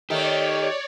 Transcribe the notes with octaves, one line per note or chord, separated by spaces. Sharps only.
D#3 A3 D#4 G4 C#5 D5